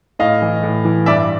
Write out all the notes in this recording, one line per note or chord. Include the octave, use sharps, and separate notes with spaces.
A2 D#5 F5
E3
A2
E3
G2 D5 E5